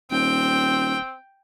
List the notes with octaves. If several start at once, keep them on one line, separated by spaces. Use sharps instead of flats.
D#1 C4 G5